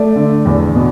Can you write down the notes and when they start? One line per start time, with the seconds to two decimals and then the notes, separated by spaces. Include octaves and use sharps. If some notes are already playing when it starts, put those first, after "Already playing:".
Already playing: A3 D5
0.15 D3
0.45 E2
0.75 B2